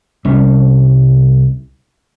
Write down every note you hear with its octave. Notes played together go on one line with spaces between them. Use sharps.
C2 G3 C#4